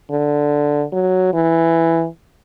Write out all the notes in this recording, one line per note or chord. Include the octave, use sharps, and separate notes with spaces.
D3
F#3
E3